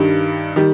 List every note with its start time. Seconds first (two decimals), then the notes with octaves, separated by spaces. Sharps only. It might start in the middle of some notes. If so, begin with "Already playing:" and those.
Already playing: G2 D#3 G3
0.56 D#3 G3